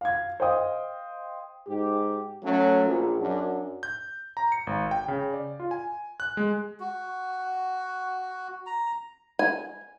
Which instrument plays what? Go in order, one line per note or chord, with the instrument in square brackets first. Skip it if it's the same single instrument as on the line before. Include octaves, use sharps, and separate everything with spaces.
[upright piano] F5 G#6
C5 D#5 F5 G5 D#6
[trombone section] G#2 G4
F#3 A3 C#4
A#1
F#2 F#3 D4
[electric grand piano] G6
A#5
C#7
G#1
G5
C#3
D5
F4
G#5
F#6
G#3
[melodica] F#4
A#5
[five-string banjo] G#5